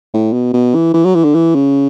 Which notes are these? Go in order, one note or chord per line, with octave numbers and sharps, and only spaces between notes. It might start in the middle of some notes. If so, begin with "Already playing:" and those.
A2
B2
B2
E3
E3
F#3
E3
D3
E3
C#3